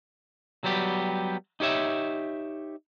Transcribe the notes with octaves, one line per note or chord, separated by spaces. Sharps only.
F#3 G3 B3 G4
D#4 G4 C#5 E5